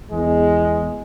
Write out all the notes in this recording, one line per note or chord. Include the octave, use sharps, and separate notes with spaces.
E2 G#3